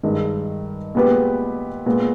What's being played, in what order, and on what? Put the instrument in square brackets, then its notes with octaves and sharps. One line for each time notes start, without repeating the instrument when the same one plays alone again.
[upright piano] G2 D#3 G#3
A#2 G#3 B3 G4 B4
A#2 G#3 B3